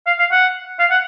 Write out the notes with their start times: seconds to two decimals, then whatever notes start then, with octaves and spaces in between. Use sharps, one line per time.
0.06 F5
0.19 F5
0.31 F#5
0.79 F5
0.90 F#5